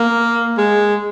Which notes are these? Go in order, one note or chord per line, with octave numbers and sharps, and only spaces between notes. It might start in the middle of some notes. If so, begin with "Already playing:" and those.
Already playing: A#3
G#3